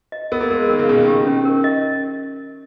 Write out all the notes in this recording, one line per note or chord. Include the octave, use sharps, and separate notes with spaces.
D#5
B3 A#4
A#3
G#3 A#4
D#3 A#4
C#3
B2 C#4
D#3
G4
C#4
A#4
D#5